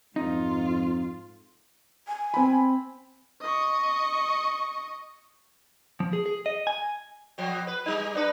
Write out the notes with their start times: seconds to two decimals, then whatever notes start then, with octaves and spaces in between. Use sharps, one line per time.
0.16 F2 G#2 D#4 F4
2.07 G#5
2.34 C4 B5
3.41 D#5 C#6
6.00 F3
6.13 G#4
6.26 G#4
6.46 D#5
6.67 G#5
7.38 B2 F3
7.67 B4
7.86 G3 D#4
8.15 D4 D#4 B4